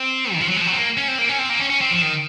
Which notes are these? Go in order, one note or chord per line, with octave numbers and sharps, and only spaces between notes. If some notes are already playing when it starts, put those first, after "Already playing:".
Already playing: C4
D#3
F3
F#3
G#3
F3
F#3
C4
A#3
C#4
C4
A#3
C#4
C4
A#3
C#4
C#4
C4
F3
D#3